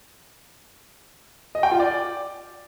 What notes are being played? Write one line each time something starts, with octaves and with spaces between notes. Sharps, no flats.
D#5
G5
F4
D5